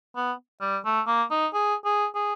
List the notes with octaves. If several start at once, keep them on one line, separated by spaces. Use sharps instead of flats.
B3
G3
A3
A#3
D#4
G#4
G#4
G#4